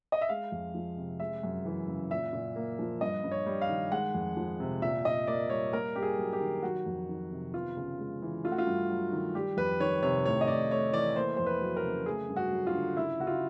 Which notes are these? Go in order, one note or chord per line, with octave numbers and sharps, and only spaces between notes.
D#5
E5
G#3 F5
F2
F3
C3
G#3 E5
F#2
E3
C#3
A#2 E5
A#2
A#3
F3
G2 D#5
G2
C#5
G3
F5
D#3
G#3 F#5
F2
F3
C3
A#2 E5
A#2 D#5
A#3 D5
G3 C#5
A#3 A#4
G2 G4
G#4
F#3
G4
D#3
F#3 F#4
F2
D#3
C3
B3 F4
C#3
G#3
E3
A3 F4
F#4
F4
G2
F#3
D#3
G3 G4
F2 B4
D#3 C#5
C3 C#5
A2 C#5
D#5
A2 D5
A3 C#5
E3 D5
A#3 C5
F2 C5
B4
F#3
A#4
C#3
A3 G#4
G2
F#4
F#3
F4
D3
C#3 E4
C#3 F#4
F4